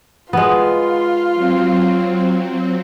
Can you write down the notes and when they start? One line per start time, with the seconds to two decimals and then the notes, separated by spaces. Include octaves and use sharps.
0.33 G#3 B3 F4
1.35 F#3 C4